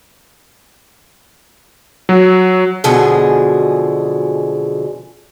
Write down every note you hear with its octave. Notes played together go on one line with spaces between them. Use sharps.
F#3
F#2 B2 D3 F3 G#3 G#4